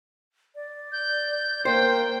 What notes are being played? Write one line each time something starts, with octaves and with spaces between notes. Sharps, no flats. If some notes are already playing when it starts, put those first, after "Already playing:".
D5
G6
A#3 C5 G5